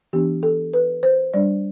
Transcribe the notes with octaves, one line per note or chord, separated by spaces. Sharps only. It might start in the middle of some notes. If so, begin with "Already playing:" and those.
E3 B3 D4 G4
A4
B4
C5
G3 D4 D5